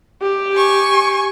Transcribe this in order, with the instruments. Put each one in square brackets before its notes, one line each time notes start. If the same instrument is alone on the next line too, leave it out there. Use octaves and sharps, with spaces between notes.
[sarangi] G4
[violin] G#5 C#6